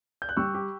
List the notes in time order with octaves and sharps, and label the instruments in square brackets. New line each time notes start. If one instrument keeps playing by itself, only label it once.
[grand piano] G6
F#6
[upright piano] G3 [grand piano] C#6 E6
[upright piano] G4